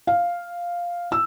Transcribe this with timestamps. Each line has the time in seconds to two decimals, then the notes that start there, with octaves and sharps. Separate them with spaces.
0.07 F5
1.12 E6